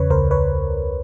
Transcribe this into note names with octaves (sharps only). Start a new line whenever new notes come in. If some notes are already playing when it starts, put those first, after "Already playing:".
Already playing: E2 C#3 B4 C#5
C#2 A#4 C5
B4 C#5